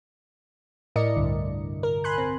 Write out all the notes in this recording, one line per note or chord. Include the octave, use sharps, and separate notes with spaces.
A2 E4 A#4 D5 D#5 C#7
C2 G2 D3
A#4
G#5 B5 C6 F#6
C4